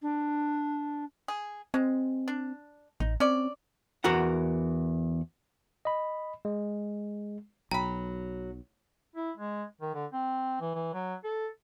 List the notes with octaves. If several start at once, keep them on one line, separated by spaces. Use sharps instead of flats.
D4
G#4
G#3 C4
D4
A1 D#4
C4 C#4 D5
E2 F#4 A#4 F#5
D#5 B5
G#3
B1 F#3 G5 A#5 B5
E4
G#3
D#3
D3
C4
E3
E3
F#3
A4